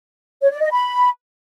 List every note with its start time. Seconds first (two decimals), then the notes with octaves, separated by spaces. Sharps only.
0.42 C#5
0.51 D5
0.61 D#5
0.71 B5